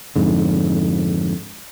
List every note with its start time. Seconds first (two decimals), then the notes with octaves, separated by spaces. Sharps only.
0.16 F2 G#2 D3